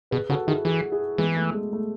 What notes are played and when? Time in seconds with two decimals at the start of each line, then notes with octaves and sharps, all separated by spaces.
0.11 B2 G#4 B4
0.30 C#3 F#4 A4
0.47 D#3 E4 G#4
0.65 E3 E4 G#4
0.92 E4 G#4
1.18 E3 G#3 B3
1.36 A3
1.54 G#3
1.73 A3